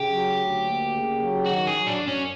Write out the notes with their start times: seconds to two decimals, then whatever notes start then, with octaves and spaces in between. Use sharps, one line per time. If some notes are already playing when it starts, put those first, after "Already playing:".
Already playing: C#3 G4
0.09 F#3
0.37 D2
0.64 A#3
0.91 C#3
1.19 F#3
1.46 D#3 F#4
1.67 G#4
1.73 F#3
1.87 D4
2.01 F#2
2.08 C#4